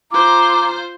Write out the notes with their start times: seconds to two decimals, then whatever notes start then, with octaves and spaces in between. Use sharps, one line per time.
0.11 F4 C5 A#5 D6